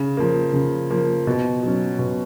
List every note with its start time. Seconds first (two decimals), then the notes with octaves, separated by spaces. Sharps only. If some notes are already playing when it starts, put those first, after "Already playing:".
Already playing: C#3
0.17 F3 A#3
0.53 C#3
0.90 F3 A#3
1.27 B2
1.63 F#3 C#4
1.99 B2